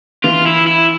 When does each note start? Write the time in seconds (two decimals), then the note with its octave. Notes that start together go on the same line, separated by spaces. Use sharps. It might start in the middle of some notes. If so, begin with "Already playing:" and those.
0.24 E3 F4
0.46 E4
0.67 E4